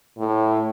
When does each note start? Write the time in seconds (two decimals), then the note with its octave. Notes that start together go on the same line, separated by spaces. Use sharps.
0.19 A2